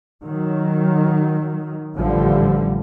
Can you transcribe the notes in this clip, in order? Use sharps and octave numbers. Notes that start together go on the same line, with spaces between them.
D#3 F#3
A1 D3 F3 G3